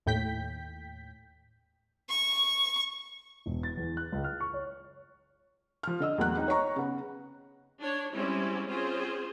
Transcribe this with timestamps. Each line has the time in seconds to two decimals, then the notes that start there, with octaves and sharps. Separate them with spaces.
0.06 D#2 A2 G5 G6 B6
2.09 C#6
3.46 E1
3.63 A6
3.77 E2
3.97 F#6
4.12 C#2
4.24 F6
4.40 C#6
4.53 C#5
5.83 F3 F6
6.00 D3 D#5 E6
6.18 E2 A2 F#3 A#3 F#5 F#6
6.37 C4 D#4
6.48 C#5 D#5 A#5 C#6
6.76 C#3 B3
7.80 D4 C#5
8.15 G3 G#3 C4 C#4 E4
8.68 C4 C#4 F4 G#4 C5